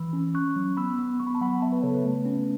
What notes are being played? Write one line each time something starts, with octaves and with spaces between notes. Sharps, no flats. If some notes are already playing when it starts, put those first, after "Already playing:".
Already playing: E3 B5 E6
C#4
C#4 C#6 F#6
F#3
B3 B5 E6
B3
B3 C#6
B5
A5
F#3 F#5 B5
B3 E5 A5
B4
C#3 A4 C#5
B4
A3
C#4